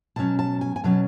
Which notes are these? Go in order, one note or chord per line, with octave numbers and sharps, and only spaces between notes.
B2 F#3 C#4 A5
A5
G#5
G#5
B2 F#3 C#4 A5